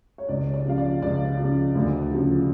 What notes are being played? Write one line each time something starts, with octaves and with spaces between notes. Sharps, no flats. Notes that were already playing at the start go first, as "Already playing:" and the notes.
C#5
C#2 D5
D5
C#3 F3 F5
D5
C#2 D5
F3
C#3
D2
C#3 F3